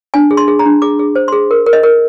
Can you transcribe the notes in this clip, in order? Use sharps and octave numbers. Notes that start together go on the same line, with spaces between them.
D4 G#5
G#4
C6
G#4
A#5
D4
G#4 D6
G#4
C5
G#4 C6
A#4
A#4
D#5
A#4